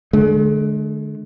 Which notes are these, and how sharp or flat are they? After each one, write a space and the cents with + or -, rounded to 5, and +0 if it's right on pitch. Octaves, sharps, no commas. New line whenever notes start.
D3 +15 G#3 +45